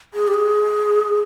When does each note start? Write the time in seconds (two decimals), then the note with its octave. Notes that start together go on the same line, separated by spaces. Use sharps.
0.14 G#4
0.28 G4
0.34 G#4